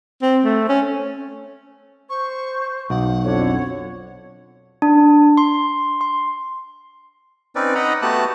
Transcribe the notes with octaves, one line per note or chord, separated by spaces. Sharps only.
C4
A3
C#4
C5 C#6
B1 F#5
F2 D3 C#5
D4
C6
C6
C4 C#4 D#4 B4 D5
D#4 D#5 F#5 A#5 B5
A3 B3 F#4 G4 A5 F#6